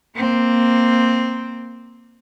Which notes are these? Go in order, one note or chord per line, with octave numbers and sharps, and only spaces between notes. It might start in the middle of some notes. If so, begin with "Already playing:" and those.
A#3 C4